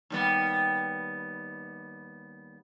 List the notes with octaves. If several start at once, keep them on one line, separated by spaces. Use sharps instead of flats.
D#2 G3 B3